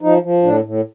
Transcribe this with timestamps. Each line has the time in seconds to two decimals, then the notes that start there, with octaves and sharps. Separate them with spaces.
0.02 F3 D#4
0.22 F3
0.43 A2 D4
0.64 A2